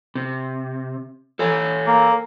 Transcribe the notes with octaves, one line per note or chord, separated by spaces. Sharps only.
C3
A4 C#5 G#5
A#3